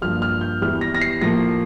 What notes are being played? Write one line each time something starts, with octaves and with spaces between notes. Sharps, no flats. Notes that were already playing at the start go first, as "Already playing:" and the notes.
G2 F3 A#3 F6
F6
G6
E2 E3 G3 F6
A#6
A#6
C7
A2 F3 A#3 A#6